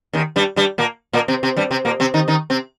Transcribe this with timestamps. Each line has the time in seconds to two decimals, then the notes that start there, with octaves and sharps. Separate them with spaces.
0.13 D#2 D#3
0.36 G2 G3
0.56 G2 G3
0.78 A#2 A#3
1.13 A#2 A#3
1.28 C3 C4
1.43 C3 C4
1.56 G2 G3
1.71 C3 C4
1.85 A#2 A#3
2.00 C3 C4
2.14 D#3 D#4
2.28 D#3 D#4
2.50 C3 C4